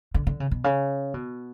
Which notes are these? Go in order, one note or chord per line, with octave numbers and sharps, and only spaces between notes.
D3
D3
C#3
B2
C#3
B2